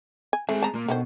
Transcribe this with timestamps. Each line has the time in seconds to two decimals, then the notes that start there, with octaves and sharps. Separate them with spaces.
0.33 G#5
0.49 G#3 A3 C4 G#4
0.63 A5 A#5
0.74 A#2 A#3
0.88 B2 D3 D#3 C5